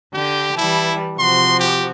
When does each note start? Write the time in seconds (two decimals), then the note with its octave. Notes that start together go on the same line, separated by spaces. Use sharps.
0.14 D3 G4 G6
0.58 E3 G3 E4 A5
1.19 C3 F3 F#4 C6
1.59 G4